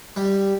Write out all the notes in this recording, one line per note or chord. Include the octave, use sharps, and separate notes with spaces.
G3